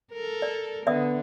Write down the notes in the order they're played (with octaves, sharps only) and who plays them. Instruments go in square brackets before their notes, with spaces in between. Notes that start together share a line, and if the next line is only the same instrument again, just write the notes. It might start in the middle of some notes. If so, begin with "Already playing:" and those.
[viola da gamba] A4 A#4
[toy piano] D5
[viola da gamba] D3 [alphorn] B3 [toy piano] D5 E5 D#6